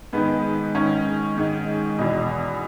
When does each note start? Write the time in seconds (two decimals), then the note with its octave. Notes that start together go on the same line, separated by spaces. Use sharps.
0.13 G#2 D#3 B3
0.75 G#2 D#3 C#4
1.37 G#2 D#3
1.99 E2 B2 D#4